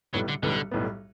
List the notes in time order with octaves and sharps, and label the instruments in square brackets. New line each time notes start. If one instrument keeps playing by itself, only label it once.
[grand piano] B1 A2 G3 B3 [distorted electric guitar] F#3
[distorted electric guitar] D3
[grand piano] B1 A2 G3 B3 [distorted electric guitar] D3
[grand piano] B1 A2 G3 B3